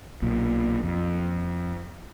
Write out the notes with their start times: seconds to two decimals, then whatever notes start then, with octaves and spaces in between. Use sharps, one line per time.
0.22 B1 A#2
0.84 F2